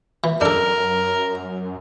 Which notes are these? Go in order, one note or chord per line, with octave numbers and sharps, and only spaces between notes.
E3
F#2 D4 A4 A#4